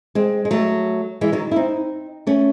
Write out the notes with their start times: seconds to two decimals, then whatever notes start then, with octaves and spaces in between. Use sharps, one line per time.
0.15 G#3 C4
0.45 G#3
0.51 F#3 A3
1.21 E3 G#3
1.32 D#3 F#3
1.51 E4
1.56 C4 D#4
2.27 A3 C#4